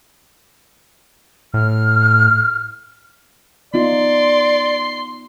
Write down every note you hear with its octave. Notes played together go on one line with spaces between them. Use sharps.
A2 F6
B3 D#4 F4 D5 C6